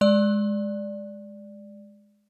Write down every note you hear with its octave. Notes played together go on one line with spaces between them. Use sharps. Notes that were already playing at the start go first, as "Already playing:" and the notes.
G#3 D5